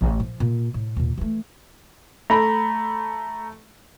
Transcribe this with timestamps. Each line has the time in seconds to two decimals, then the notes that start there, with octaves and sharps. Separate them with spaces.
0.01 A1
0.19 A#2 F3
0.40 A#2
0.74 A2
0.96 D#2 A#2
1.18 E3 A3
2.30 A3 A#5 B5